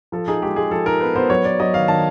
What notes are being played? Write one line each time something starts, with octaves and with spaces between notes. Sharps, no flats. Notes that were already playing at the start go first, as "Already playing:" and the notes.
F3 A4
D#4 G#4
G#3 G4
G#3 G#4
F3 A4
D#4 A#4
B3 B4
B3 C5
F#3 C#5
B3 D5
F#3 D#5
D#3 F5
D#3 A5